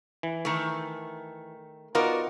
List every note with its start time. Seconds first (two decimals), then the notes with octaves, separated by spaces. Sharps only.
0.23 E3
0.45 D#3 A3
1.95 B3 D#4 F4 F#4 A#4 D5